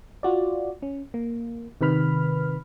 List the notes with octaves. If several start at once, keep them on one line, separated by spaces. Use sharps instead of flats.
F4 F#4 D5
C#4
A#3
C3 D#3 B4 B5 F6